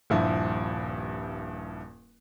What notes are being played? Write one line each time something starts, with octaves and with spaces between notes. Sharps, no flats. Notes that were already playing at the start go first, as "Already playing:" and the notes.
D#1 G2 F3 E4